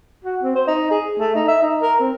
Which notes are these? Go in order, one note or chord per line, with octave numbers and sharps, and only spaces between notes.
F#4
C4
C5
D#4
G#4
A3
D#4
E5
D#4
A#4
C4